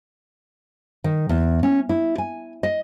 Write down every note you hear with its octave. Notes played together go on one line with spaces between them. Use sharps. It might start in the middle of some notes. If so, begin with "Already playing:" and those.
D#3
E2
C#4
E4
G#5
D#5